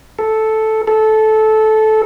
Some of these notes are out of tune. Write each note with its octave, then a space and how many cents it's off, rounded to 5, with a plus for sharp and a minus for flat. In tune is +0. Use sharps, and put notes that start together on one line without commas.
A4 -5
A4 -15